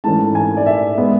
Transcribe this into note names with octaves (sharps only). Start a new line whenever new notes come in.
G#2 E3 A3 C#4 A5
G#5
D5
E5
G#3 B3